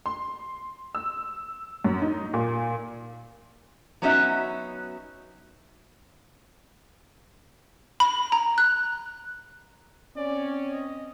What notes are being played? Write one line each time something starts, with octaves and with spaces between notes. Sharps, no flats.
C6
E6
F#2
D#4
A#2
F#3 B3 C#4 D#4 F#4 E5
B5
A#5
F#6
C4 C#4 D5
D#5